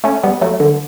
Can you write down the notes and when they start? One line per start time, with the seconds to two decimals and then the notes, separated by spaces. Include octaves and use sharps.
0.04 A3 C#4
0.23 G3 B3
0.41 F#3 A3
0.60 D3